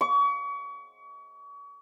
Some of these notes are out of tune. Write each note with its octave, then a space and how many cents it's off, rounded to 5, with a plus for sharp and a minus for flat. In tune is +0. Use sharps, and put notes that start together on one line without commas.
C#6 +35